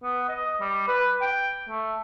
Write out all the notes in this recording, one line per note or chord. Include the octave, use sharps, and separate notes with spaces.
B3
D#5
G3
B4
G5
A3